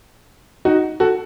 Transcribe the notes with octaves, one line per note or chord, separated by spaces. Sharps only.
D#4 F#4
F#4 A4